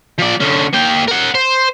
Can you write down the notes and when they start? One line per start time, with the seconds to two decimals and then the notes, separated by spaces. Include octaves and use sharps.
0.18 F3 D5
0.40 D3 C#4
0.73 A#3 G5
1.08 A#4 F#5
1.35 C5